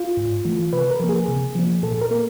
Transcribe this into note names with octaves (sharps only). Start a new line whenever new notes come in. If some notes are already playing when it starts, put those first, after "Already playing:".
Already playing: F4
G#2
E3 A3
C3 B4
A#4
F3 A#3
G#4
C3
F3 A#3
A#2 A4
A#4
A#3